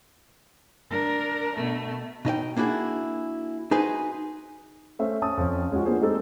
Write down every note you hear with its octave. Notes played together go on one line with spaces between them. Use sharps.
D4 A#4
B2 A3
B2 D#4 D#5 G5
A#3 D4 E4 F#4 G#4
D#4 F#4 G#4 B4 C5
A3 C#4 C5 E5
C#4 A5 D#6
F2 C#4
G#3 C#4 F4 F#4
A#3 B3 D4 F4 G#4 C5
G#3 A3 C4 D#4 G4 A4